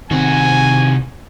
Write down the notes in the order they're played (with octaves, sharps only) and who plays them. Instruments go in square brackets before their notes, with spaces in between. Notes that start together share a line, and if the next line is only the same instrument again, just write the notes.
[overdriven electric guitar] C2 F#4 [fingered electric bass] D#3 C4 [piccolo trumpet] G#5